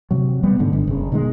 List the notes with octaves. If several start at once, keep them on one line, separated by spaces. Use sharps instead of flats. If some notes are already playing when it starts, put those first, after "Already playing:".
C3 F#3
E1 F3 G3 B3
G#2 D3
G1
F#1 C#3
B2 D#3 F3 G#3